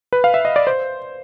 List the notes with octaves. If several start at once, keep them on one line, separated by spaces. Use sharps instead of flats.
B4
F5
E5
D#5
D5
C5